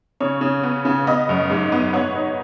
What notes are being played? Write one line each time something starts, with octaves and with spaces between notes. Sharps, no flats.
C#3 C#5
C#3
B3
C#3
B3 D#5
F#2
G#2
B3
B3 C#5 F#5
D#4